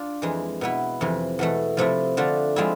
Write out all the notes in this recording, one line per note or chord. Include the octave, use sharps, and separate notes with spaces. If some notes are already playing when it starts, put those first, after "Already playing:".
Already playing: D4 F4
F2 E3 G#3
B2 B3 E4
F2 C3 E3
E2 B2 A3
C3 F3 A3 E4
D3 A3 D4 F4
F3 G#3 C4 E4